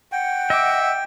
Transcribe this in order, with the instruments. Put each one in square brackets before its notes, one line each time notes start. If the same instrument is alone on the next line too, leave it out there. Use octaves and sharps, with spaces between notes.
[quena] F#5 [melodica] G5
[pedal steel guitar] D#5 D6 [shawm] E5